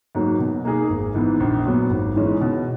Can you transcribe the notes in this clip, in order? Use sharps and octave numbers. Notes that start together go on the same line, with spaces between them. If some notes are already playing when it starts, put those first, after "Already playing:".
G#2 F#3 A#3
B2
A#3 D#4 G#4
G#1
G#2 E3 B3
A#1
A#2 F#3 B3
G#1
G#2 E3 G#3 C#4
B2